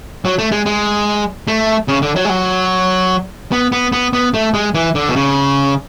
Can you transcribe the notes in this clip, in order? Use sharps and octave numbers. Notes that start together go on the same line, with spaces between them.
F#3
A3
G#3
G#3
A3
C#3
D3
F#3
G#3
F#3
B3
B3
B3
B3
A3
G#3
E3
D3
B2
C#3